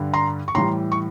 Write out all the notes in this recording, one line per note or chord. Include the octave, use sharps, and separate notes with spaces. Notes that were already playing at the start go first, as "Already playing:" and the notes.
Already playing: G2 D3 G3
A#5 C6
C#6
A2 E3 G3 A#5 C6
C#6